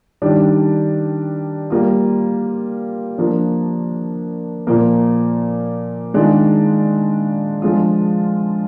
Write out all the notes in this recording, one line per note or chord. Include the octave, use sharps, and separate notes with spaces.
D#3 G3 D4
G3 A#3 F4
F3 A#3 D4
A#2 F3 A#3
D#3 G#3 D4 F4
F3 G#3 D4 F4